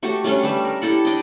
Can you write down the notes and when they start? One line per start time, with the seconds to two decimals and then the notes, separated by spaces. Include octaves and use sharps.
0.03 A3 F#4 G4 A4
0.24 G3 A3 C#4 D4
0.43 G3 G4 B4 E5
0.64 A#4
0.82 E4 G4 A4 F#5
1.05 D4 D#5 G5